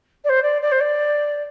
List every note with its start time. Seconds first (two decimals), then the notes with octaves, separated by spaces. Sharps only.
0.24 D5
0.29 C5
0.42 D5
0.62 D5
0.72 C5
0.80 D5